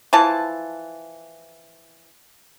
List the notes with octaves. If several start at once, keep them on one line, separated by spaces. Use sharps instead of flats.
E3 F3 A5